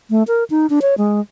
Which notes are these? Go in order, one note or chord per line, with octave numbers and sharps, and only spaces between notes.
A3
A#4
D#4
D4
C#5
G#3